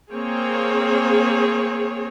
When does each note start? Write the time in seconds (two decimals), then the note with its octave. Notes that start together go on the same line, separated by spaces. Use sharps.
0.13 A#3 C4 G#4 C#5